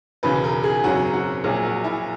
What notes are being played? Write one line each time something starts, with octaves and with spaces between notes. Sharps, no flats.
E1 E2 C#3 E3 B4
A#4
G#4
G#1 F#2 C#3 F#3 F#4
F#4
A#1 A#2 F#3 G#4
F#4
E4